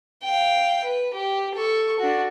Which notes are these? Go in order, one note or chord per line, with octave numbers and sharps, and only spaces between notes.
F5 G5
B4
G4
A4 C#6
D4 F#4